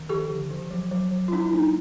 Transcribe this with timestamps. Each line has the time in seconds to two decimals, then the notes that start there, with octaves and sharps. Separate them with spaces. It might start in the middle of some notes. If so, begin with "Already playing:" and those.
Already playing: D#3
0.09 F3 G4 A4
0.30 D3
0.50 F3
0.71 F#3
0.91 F#3
1.12 F#3
1.28 F4
1.32 F#3 D4 E4
1.46 E4
1.53 A#3 D#4